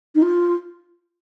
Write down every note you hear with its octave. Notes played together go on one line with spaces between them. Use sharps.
D#4
F4